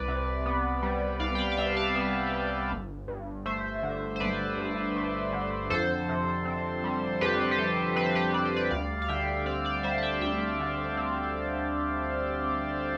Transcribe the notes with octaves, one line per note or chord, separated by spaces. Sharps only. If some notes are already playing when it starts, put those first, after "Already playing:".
Already playing: C2 B4 D5
C3
B3
G3
C2 D5 F5
G5
D5 F5
F5
C3 E5 G5
F5 A5
B3
G3
G1
G2
A3 C5 E5
D3
C5
G1 B4 D5
G2
A3
D3
F2 A4 C5
C3
C4
G3
F2 G4 B4
G4
C3 A4
C4 B4
C5
G4 B4
G3 D5
C5
B4 D5
D2 D5 F5
F5
D3 E5 G5
C4 D5 F5
D5 F5
G3 C5 E5
A5
E5 G5
D2 E5 G5
D3
C4